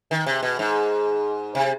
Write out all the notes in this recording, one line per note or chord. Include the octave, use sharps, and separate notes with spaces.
D#3
C3
B2
G#2
C3